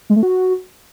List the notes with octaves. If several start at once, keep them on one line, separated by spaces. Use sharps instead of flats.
G#3
A3
F#4